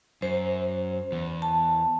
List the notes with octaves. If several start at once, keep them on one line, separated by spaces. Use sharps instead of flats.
F#2 C5
E2
A5